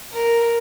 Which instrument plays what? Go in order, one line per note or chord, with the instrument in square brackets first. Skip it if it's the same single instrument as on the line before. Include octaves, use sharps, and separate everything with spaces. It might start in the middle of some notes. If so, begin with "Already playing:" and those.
[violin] A#4